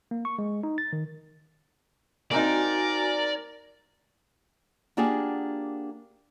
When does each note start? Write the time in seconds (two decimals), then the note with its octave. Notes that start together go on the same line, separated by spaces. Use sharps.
0.11 A#3
0.25 C#6
0.39 G#3
0.63 D#4
0.78 A6
0.93 D#3
2.31 A#3 C4 D#4 F#4 A#4 D5 G#5
4.97 A#3 D4 F4 G4 G#4 F#5